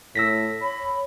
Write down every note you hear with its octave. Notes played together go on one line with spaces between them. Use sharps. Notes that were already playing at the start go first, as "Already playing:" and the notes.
A2 E6 A#6 B6
C#5 B5